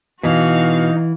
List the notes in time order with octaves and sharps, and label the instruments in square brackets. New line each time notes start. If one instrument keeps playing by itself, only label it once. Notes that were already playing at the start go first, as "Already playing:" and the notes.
[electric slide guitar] B2 [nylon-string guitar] E3 [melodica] D#4 [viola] F#4 F5